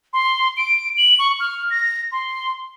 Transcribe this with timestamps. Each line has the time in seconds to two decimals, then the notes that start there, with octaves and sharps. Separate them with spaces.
0.13 C6
0.57 D7
0.97 F#7
1.19 C#6
1.40 F6
1.70 A#6
2.12 C6